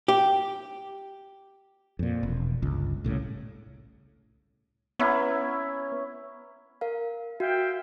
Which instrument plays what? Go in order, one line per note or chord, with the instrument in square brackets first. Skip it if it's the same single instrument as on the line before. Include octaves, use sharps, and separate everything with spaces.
[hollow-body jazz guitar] G4
[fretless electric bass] F2 A#2
E1
G1 C#2
C2 A2 C#3
[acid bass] B3 [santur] C#4 E4 A#5
[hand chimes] A#4 F5
[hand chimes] F#4 [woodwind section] E5 F5 G5